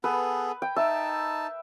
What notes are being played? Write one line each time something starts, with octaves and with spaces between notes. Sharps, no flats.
B3 G#4 A4 B4
G5
D#4 E5 A5